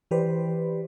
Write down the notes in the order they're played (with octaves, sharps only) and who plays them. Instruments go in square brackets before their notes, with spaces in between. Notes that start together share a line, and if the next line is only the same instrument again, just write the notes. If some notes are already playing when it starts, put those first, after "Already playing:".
[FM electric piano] E3 G4 B4 C5 D5